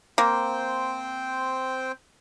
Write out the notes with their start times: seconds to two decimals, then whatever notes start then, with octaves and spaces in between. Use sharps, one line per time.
0.18 A#3 C4 C5 G5